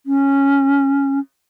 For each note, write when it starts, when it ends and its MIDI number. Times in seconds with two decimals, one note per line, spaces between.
0.06 1.19 61